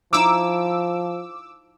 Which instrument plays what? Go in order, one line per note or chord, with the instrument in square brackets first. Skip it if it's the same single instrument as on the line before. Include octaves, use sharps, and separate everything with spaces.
[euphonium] F3 [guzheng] D#4 E4 [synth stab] D6 E6